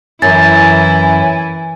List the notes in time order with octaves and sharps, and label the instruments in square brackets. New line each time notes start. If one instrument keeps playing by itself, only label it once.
[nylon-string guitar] F#2 [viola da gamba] E3 E4 [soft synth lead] G#5 [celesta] A6